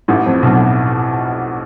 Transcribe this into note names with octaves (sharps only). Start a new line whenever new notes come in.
A1 A2
F2
B1 B2